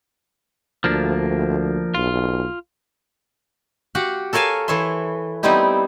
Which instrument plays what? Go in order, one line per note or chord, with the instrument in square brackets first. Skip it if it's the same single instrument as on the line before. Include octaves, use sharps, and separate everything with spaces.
[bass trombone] D2 [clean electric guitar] F3 A#3 D4
[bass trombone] B1 [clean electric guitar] F4
[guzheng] F#4 G4 F5 F#5
A4 A#4 C#5 F5 G#5 A5
E3 A4 C#5 E5 C6
G3 B3 C4 D#4 E4 G4